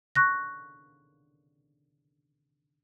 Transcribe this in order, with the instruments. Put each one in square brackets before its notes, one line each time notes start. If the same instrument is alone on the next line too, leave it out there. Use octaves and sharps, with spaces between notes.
[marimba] C#6 F#6 A#6